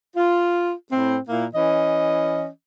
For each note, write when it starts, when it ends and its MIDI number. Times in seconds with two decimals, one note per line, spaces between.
0.16 0.72 65
0.91 1.17 45
0.91 1.17 60
1.28 1.45 46
1.28 1.45 58
1.28 1.45 64
1.54 2.47 52
1.54 2.47 61
1.54 2.47 75